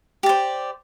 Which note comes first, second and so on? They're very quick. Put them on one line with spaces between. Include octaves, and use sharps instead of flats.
G4 D5 C5